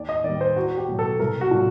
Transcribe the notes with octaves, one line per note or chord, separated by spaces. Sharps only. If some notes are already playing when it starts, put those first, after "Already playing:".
Already playing: D#2 D5
D#5
D#3 G3 D5
C5
E2 F#4
G4
B2 F#3
A4
C2 A#4
F#4
A#2 F#3